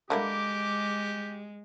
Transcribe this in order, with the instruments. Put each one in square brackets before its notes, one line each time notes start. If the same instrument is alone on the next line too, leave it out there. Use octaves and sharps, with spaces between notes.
[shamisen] D3 A#3 E4 [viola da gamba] G#3 [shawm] G4 [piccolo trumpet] D6